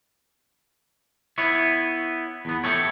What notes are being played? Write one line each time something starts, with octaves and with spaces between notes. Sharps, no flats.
B3 E4 C#5
E2 B3
A3 G4 A4 C#5